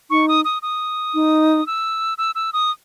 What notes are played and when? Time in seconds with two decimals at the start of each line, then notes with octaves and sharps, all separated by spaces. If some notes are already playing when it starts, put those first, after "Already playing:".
0.10 D#4 C#6
0.28 D#6
0.45 D#6
0.62 D#6
1.14 D#4
1.67 E6
2.18 E6
2.35 E6
2.53 D#6